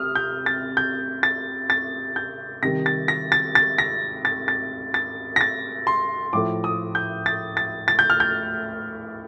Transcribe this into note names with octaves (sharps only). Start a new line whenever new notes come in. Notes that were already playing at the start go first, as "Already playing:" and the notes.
Already playing: C3 D#6 F6
G6
A6
G6
A6
A6
G6
C3 D#3 G3 A#6
A6
A#6
A6
A6
A#6
A6
A6
A6
A#6
A6
C6
A2 F3 A3 D6
D#6
G6
A6
A6
A6
G6
F6
G6